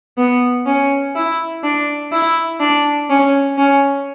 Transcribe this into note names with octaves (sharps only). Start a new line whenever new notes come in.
B3
C#4
E4
D4
E4
D4
C#4
C#4